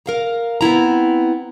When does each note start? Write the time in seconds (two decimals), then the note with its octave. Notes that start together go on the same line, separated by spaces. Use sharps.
0.06 A#4 F5 A#5
0.61 B3 C4 E4 A#5